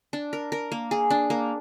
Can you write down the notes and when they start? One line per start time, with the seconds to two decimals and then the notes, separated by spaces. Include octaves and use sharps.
0.13 D4
0.33 A#4
0.52 A#4
0.72 A#3
0.91 G#4
1.10 D4
1.30 A#3